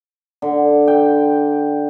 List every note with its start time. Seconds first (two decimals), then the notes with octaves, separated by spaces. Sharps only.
0.42 D3
0.88 G5